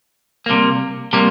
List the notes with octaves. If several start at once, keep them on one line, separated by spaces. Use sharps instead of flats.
C3 G3 A#3
C3 G3 A#3